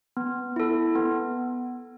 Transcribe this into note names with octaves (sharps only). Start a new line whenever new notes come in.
B3
E4 A4
B3